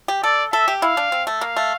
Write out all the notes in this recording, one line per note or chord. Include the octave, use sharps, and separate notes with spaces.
G4
A4 D5
A4 E5
G4
E4 F5
D4
C4
A3
A#3 F5
A3